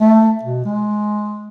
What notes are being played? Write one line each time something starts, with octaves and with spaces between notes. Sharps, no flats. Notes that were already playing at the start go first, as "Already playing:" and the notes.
A3
B2
G#3